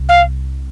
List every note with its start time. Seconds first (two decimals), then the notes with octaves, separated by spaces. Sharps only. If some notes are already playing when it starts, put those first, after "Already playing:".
Already playing: C2
0.09 F5